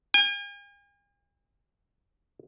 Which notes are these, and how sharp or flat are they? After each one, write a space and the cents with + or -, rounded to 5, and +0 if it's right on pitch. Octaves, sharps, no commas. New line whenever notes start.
G#5 -45